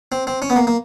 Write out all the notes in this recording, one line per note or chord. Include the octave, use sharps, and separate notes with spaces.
C4
C4
C#4
B3
A#3
A#3